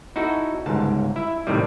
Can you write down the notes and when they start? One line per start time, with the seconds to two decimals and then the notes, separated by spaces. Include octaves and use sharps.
0.16 D#4 E4 F#4 A4
0.66 G1 C#2 G#2 A5
1.16 E4 E5
1.47 A2 C3 D#3 G3